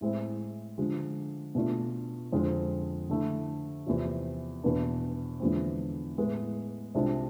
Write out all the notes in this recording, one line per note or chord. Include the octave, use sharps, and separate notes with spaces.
A2 G#3 C4 E4
D3 F3 G#3
B2 A3 D4 F4
F2 D3 G#3 C4 F4
D3 A3 E4
E2 C3 F3
E2 B2 B3 D4
E2 D3 F3 G#3 C4
A2 G#3 B3
C2 C3 G#3 D4 F4